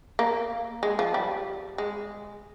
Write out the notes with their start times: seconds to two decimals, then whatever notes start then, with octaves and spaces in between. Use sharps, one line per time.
0.19 A#3
0.83 G#3
0.99 F3
1.14 G3
1.78 G#3